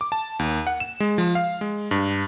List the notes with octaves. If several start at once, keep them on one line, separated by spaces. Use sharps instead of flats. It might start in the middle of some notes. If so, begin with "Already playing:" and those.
D6
A5
D#2
F#5
E7
G#3
F3
F5
G#3
G2